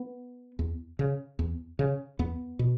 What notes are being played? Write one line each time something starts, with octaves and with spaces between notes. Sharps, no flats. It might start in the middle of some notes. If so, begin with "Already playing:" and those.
Already playing: B3
E2
C#3
E2
C#3
E2 B3
B2